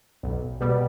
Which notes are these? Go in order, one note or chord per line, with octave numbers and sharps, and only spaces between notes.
B1
B2 G3 B3